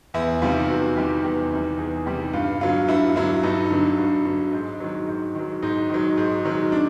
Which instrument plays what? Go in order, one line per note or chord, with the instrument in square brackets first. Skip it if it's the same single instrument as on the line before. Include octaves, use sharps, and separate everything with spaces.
[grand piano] E2 E4
C3 D#3 G3 F4
E2 F#4
C3 D#3 G3 G4
E2 G4
C3 D#3 G3
E2 G#4
C3 D#3 G3 G4
G2 F4
D3 F#3 F4
G2 E4
D3 F#3 E4
G2 D#4
D3 F#3
G2
D3 F#3
G#2
D#3 F#3
G#2
D#3 F#3
G#2 D#4
D#3 F#3
G#2
D#3 F#3
D4